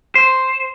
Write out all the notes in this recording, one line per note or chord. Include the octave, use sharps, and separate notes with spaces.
C5